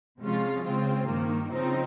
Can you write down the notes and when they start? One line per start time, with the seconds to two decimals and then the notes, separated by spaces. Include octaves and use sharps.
0.20 C3 F3 G#3 C#4 F4
0.64 C#3 G#3 C4 F4
1.07 G2 D#3 A#3
1.51 C#3 F3 C4 D#4